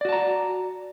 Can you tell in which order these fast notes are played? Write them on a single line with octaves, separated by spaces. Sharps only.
D5 F#4 A5 A#5